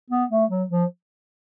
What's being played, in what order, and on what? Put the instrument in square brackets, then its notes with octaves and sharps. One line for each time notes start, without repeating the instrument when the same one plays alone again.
[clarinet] B3
A3
F#3
F3